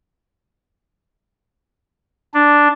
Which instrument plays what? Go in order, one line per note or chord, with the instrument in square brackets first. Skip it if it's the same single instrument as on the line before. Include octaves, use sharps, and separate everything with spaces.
[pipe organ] D4